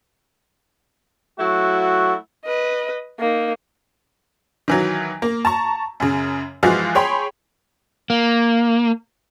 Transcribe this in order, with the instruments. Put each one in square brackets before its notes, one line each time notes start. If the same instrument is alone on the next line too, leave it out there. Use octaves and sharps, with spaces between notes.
[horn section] F#3 A3 E4 F#4
[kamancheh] B4 D#5
A#3 D#4
[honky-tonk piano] D#3 E3 F#3
A#3
A5 A#5 C#6
F#2 C#3
E3 F3 G#3 F4 F#4
G#4 C#5 G5 B5 C6
[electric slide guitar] A#3